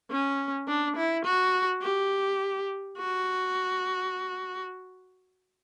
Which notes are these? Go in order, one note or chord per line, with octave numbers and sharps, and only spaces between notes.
C#4
D4
E4
F#4
G4
F#4